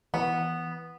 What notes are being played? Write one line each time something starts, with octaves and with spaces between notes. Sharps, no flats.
E3 B3